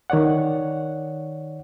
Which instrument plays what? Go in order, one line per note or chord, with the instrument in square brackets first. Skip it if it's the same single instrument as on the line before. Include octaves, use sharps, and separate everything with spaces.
[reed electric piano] D#3 C#5 D5 F#5